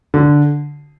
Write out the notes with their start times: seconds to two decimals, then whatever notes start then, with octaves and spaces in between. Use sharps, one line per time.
0.14 D3